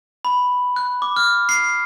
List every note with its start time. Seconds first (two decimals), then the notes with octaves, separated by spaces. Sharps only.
0.25 B5
0.76 F#6
1.02 D6
1.16 F6
1.49 C7